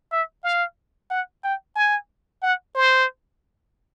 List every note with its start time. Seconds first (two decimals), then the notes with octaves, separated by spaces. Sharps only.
0.12 E5
0.44 F5
1.11 F#5
1.44 G5
1.76 G#5
2.43 F#5
2.75 C5